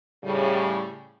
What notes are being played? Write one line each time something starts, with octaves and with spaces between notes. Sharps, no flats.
A2 C#3 G3